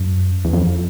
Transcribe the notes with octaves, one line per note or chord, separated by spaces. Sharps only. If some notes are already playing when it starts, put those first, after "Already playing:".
Already playing: F#2
E2
F2